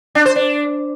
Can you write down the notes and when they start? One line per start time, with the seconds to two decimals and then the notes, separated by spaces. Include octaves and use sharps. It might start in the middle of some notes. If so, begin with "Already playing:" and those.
0.15 D4
0.26 C5
0.36 D4